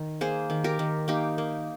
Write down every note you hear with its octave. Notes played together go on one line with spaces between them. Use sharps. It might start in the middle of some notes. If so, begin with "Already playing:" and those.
Already playing: D#3
A#3 G#4 C5
D#3
G4 A#4
D#3
A#3 D#4 G4
A#3